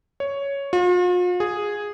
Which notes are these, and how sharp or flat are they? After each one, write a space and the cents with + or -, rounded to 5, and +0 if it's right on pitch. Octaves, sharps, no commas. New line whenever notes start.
C#5 +5
F4 +45
G#4 -5